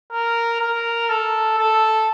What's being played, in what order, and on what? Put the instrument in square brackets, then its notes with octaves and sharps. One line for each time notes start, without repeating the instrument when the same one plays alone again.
[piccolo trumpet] A#4
A#4
A4
A4